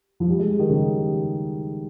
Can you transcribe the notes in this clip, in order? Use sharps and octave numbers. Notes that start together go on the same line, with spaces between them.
F3
G3
G#3
D#3
C#3